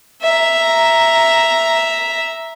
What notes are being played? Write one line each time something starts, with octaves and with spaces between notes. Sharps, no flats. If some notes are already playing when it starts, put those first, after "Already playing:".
E5 A#5